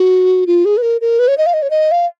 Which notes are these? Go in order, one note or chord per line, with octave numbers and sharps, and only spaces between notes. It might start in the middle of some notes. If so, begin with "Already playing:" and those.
Already playing: F#4
F4
G#4
B4
A#4
A#4
B4
C#5
D#5
F5
D#5
C#5
D#5
F5